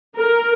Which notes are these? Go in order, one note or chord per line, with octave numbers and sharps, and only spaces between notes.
A#4